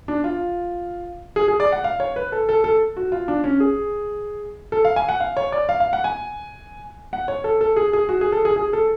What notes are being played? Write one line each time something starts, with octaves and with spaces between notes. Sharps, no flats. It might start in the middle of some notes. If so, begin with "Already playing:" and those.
D4
F4
G#4
G#4
D5
F#5
F5
C#5
B4
A4
A4
A4
F#4
F4
D4
C#4
G#4
A4
F5
G#5
F#5
F5
C#5
D5
F5
F5
F#5
G#5
F#5
C#5
A4
A4
G#4
G#4
F#4
G#4
A4
G#4
G#4
A4